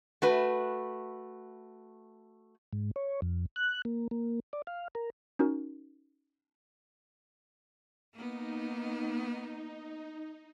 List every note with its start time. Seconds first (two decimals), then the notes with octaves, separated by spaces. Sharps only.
0.22 A3 F#4 B4
2.73 G#2
2.96 C#5
3.22 F2
3.56 F#6
3.85 A#3
4.11 A#3
4.53 D5
4.67 F5
4.95 A#4
5.39 C#4 D#4 F#4 A#4
8.13 A#3 B3 D#4